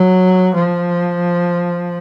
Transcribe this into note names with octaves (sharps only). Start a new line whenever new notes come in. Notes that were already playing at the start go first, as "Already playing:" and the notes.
Already playing: F#3
F3